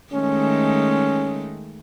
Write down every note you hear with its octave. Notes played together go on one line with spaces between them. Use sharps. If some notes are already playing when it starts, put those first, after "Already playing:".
D#3 G#3 A3 C#4